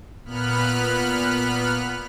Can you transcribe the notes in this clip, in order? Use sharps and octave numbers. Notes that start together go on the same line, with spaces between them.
A#2 B3 B5 F6 F#6